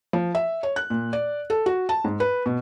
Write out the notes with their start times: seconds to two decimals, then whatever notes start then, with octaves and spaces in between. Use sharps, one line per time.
0.13 F3
0.35 E5
0.63 C#5
0.76 F#6
0.90 A#2
1.13 D5
1.50 A4
1.66 F#4
1.89 A5
2.04 G#2
2.20 B4
2.46 B2